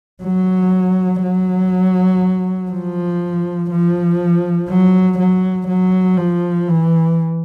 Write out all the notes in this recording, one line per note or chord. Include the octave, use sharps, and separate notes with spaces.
F#3
F#3
F3
F3
F#3
F#3
F#3
F3
E3